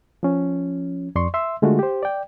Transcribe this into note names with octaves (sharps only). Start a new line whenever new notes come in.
F3 C#4
F2 D5 C6 C#6
E5 C6 E6
D3 G#3 A3 F4 F#4
G4 C5
D5 G5